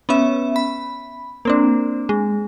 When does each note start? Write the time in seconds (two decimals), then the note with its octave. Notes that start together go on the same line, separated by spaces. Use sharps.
0.09 B3 C#4 E5
0.56 B5
1.45 A#3 C4 D4
2.09 G#3